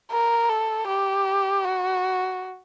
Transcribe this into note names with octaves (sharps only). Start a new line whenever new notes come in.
A#4
A4
G4
F#4